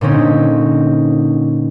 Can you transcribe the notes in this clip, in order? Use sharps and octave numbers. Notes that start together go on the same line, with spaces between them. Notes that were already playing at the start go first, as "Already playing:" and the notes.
A#2 D3 C4 C#4 D#4